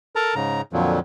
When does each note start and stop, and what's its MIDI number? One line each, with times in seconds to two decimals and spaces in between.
0.16 0.35 69
0.16 0.35 70
0.16 0.35 81
0.16 0.35 82
0.35 0.61 44
0.35 0.61 49
0.35 0.61 82
0.73 0.99 41
0.73 0.99 46
0.73 0.99 50
0.73 0.99 53
0.73 0.99 54